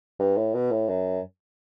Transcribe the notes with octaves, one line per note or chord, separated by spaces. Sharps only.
G2
A2
B2
A2
F#2